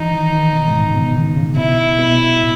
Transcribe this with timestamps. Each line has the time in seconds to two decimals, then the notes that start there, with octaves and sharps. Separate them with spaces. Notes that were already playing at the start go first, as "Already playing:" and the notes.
Already playing: E3 D#4
0.11 D#3
0.33 D#3
0.53 B2
0.68 G#2
0.74 A2
0.87 C#3
0.95 B2
1.16 D#3
1.36 C#3
1.57 B2 E4
1.99 B2
2.40 A2